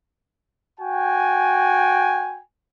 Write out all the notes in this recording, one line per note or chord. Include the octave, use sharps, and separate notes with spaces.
F#4 G5 G#5